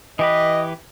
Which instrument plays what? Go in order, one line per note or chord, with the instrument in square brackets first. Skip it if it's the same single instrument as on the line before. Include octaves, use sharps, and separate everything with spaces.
[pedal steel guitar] E3 G4 B4 [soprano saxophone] D#5